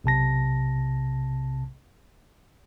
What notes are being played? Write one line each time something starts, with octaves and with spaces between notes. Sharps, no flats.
B1 C3 A5 A#6